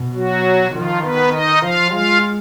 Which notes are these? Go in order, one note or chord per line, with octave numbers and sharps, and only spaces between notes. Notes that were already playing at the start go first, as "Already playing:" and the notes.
Already playing: B2
F#3 F#4
D#3 F3 F4
B3 B4
D#4 D#5
F3 F4 F5
G#3 F4 F5